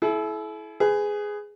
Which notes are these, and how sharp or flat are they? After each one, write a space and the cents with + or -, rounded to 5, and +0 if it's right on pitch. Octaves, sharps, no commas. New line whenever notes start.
E4 +0 A4 -45
G#4 +0 B4 +30